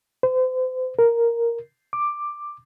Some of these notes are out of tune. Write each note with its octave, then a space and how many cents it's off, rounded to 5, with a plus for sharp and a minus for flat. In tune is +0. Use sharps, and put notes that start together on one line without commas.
C5 -35
A#4 +0
D6 +10